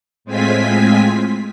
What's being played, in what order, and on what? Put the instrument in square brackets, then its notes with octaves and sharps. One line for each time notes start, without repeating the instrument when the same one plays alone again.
[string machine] A2 G#3 C4 F4 G#5 B6